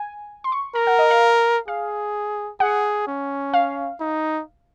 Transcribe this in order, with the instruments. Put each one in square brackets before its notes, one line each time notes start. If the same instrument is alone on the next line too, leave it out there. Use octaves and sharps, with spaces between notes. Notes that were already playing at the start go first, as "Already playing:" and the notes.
Already playing: [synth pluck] G#5
C6
C#6
[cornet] A#4 [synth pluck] A#5
[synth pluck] F#5
D#5
F5
[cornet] G#4 [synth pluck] F5
[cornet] G#4 [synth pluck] F#5
[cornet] C#4
[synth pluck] F5
[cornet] D#4